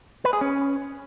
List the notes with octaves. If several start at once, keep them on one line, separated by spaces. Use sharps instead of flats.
B4
G#4
C#4